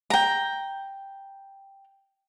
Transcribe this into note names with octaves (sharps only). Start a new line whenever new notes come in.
G5 A#5